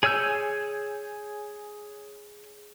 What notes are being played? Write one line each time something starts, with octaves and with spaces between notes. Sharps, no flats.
G#4 C#5 G#5 E6 G6